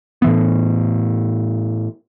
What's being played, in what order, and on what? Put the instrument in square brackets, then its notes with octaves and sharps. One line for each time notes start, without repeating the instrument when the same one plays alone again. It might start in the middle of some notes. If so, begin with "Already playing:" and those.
[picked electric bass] A2 E3 B3